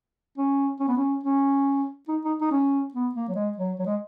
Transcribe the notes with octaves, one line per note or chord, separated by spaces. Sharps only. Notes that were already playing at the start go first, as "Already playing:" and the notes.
C#4
C#4
B3
C#4
C#4
D#4
D#4
D#4
C#4
B3
A#3
F#3
G#3
F#3
F#3
G#3